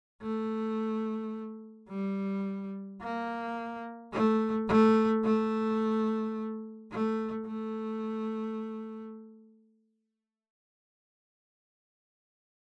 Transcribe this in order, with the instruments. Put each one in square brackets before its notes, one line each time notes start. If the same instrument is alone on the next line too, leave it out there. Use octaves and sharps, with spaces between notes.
[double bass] A3
G3
A#3
A3
A3
A3
A3
A3